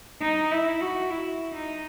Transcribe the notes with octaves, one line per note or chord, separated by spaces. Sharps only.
D#4
E4
F#4
E4
D#4